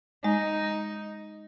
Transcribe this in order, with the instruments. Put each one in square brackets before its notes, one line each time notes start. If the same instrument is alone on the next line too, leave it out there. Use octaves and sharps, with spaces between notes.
[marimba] G#3 [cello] D#4